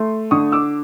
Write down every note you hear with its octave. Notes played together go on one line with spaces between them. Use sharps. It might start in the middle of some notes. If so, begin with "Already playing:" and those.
Already playing: A3 C6
D3 C#6 D#6
D6 E6